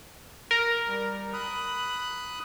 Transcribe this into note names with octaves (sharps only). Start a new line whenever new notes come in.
A#4
G3
B5 D#6 F#6